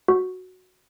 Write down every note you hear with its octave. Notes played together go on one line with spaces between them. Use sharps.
F#4